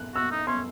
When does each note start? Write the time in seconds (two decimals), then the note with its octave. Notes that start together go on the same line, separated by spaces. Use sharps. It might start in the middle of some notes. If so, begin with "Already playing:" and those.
Already playing: F#6
0.15 F#4 E6
0.31 D#4
0.47 C#4 C6